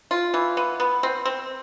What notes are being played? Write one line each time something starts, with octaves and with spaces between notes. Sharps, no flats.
F4
E3
B3
B3
C4
C4